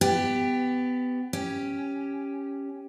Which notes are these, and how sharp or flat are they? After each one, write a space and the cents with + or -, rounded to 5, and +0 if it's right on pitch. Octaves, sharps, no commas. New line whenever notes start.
B3 +25 G4 +5
C#4 +0 G4 +0